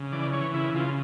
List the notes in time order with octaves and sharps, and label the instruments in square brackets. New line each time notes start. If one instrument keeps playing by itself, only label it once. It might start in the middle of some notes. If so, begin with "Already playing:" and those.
Already playing: [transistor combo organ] C#3
E3 D5
E3 C#5
C#3 E4
C#3 F4